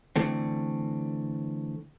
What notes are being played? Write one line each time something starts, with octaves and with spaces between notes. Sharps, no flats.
D3 E3 A3 C4